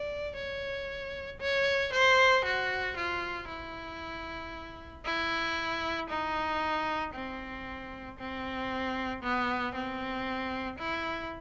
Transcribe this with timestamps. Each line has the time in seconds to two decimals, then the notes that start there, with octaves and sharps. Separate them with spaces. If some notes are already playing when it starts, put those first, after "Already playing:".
Already playing: D5
0.36 C#5
1.40 C#5
1.93 C5
2.45 F#4
2.97 F4
3.49 E4
5.06 E4
6.10 D#4
7.15 C4
8.19 C4
9.23 B3
9.75 C4
10.79 E4